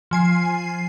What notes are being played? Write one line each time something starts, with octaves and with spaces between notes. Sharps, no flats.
F3 G#5 C7